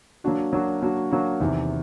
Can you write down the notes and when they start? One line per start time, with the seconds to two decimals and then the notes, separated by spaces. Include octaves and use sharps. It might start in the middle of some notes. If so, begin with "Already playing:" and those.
0.24 F#3 A#3 D4 F#4
0.53 F#3 A#3 D4 F#4
0.82 F#3 A#3 D4 F#4
1.11 F#3 A#3 D4 F#4
1.40 E2 C3 D#3